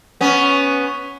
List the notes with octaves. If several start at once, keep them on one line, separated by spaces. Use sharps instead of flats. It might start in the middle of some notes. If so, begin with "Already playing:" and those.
B3 C#4